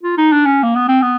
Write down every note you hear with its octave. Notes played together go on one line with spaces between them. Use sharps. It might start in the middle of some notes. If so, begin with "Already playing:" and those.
F4
D#4
D4
C#4
A#3
B3
C4
B3